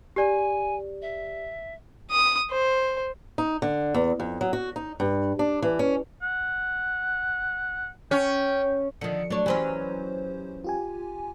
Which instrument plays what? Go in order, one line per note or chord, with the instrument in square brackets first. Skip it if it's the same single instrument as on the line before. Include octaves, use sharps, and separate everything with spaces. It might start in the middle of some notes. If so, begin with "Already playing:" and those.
[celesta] G4 D5 [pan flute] G#5
[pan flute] E5
[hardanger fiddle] D#6
C5
[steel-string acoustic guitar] D#4
D3
E2
F2
F#3
F#4
D#4
G2
D4
E3
C#4
[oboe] F#5
[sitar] C#4 [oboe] G5
[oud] D3 D#3 [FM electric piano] F3 C#7
[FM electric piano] F#3 A3 [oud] D4 C#5
[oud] E3 F#3 C#4 [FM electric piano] G4 C5
[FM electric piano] F4 G4 G#5